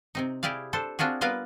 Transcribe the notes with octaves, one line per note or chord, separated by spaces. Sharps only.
C3 C4 D#4
E4 G4 G#4 D5 F5
D4 A4 C5
C4 D4 F4 F#4 G#4
G3 B3 F4 A#4 B4 F5